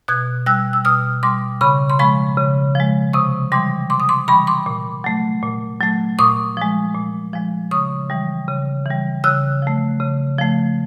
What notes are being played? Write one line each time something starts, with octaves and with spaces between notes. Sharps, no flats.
B2 F#6 G#6
G3 E6 F#6
E6
B2 D#6 F6
G3 C6 D6
C#3 B5 C#6
C6
F3 G#3 B5 C#6
C#3
F3 G#3
C3 C#6 D#6
E3 G3 C6 D6
C3 C6 D6
D#6
C6 D6
E3 G3 B5 C#6
C6 D6
A#2
F#3 A3
A#2
F#3 A3
A#2 C#6 D#6
F3 G#3
A#2
F3 G#3
C#3 C#6 D#6
E3 G3
C#3
E3 G3
C#3 E6 F#6
F3 A3
C#3
F3 A3